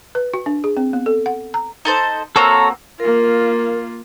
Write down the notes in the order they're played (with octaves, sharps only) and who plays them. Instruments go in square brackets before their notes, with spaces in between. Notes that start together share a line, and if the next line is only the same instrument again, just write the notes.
[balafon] B4
F#4
D4
G#4
C4
B3
A4
F#5
A#5
[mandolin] D#4 A4 C5
[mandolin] A#3 C4 F#4 [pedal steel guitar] A4 C#5 A#5
[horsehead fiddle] A#3 F4 [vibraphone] A#4